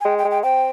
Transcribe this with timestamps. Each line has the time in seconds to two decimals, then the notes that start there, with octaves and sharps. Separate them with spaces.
0.01 G#5
0.04 G#3 G5
0.18 G5
0.25 G#3
0.31 G5
0.43 C4 G5